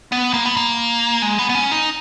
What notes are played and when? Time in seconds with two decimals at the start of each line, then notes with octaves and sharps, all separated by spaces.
0.12 B3
0.34 A#3
0.46 B3
0.57 A#3
1.22 G#3
1.39 B3
1.49 B3
1.55 C#4
1.71 D#4